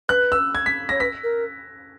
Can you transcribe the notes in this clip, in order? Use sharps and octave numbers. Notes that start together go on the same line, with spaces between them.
B4 F#6
E6
G#6
B6
C#5 A#6
B4 B6
A#4